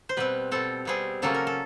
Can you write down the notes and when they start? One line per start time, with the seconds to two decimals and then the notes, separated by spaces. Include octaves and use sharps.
0.09 C5
0.17 B2 G3 C4 B4
0.51 B2 G3 C4 A4
0.85 B2 G3 C4 G#4
1.22 C#3 F#3 A#3 C#4 A4
1.34 A#4
1.47 A4